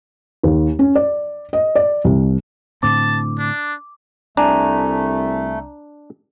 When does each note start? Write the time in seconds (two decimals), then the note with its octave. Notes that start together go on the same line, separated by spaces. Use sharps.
0.43 D#2
0.79 C#4
0.95 D5
1.53 D#5
1.75 D5
2.04 C2
2.83 A2 D3 C4 A5 D6
3.38 D4
4.37 C2 A3 D4 G#5 A#5